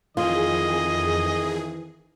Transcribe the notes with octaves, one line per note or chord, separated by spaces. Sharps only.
F2 D#3 E3 F4 G#4 D#5